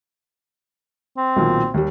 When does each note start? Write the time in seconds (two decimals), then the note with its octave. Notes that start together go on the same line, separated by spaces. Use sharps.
1.17 C4
1.36 B1 A#2 D#3
1.74 D#2 G3